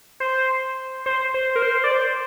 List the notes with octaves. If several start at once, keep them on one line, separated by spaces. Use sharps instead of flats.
C5
C5
C5
A#4
C5
D5
C5